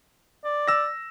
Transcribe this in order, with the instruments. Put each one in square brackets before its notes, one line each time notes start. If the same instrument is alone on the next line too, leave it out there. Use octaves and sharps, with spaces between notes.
[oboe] D5
[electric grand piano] E6 A#6